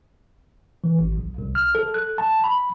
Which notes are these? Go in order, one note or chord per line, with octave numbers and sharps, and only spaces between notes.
E3
G#1
B1
C2
F6
A4
F#6
A5
B5